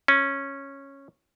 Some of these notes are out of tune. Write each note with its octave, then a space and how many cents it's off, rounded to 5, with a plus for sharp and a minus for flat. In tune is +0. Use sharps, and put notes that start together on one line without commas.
C#4 -10